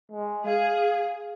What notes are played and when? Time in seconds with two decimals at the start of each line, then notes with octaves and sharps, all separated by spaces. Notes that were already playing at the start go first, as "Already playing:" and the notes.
0.12 G#3
0.46 G#4 F5